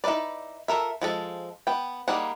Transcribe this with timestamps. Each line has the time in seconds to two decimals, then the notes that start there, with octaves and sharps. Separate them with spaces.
0.04 D#4 E4 A#4 B4 D5
0.68 F4 A4 A#4 E5
1.02 F3 G#3 A4
1.67 B3 G5
2.08 G3 A#3 D#4 G#4 F#5